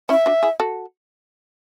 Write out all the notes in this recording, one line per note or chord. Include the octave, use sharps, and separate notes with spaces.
C#4 E4 E5
D4 F#4
E4 G#4
F#4 A4